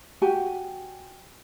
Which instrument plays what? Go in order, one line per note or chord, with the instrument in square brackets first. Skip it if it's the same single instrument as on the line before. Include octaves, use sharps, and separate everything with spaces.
[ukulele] F#4 G4 G#5